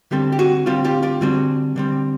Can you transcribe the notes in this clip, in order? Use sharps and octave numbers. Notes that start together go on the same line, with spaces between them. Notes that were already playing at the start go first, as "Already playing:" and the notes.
D3 G3 C4 G4 A4
G4
F#4 G#4
D3 G3 C4 F4 G4
F4 G4
F4 G4
D3 G3 C4 F#4 G#4
D3 G3 C4